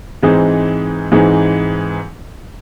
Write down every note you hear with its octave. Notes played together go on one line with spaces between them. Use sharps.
G#2 E3 G#3 C4 D#4
G#2 E3 G#3 C4 D#4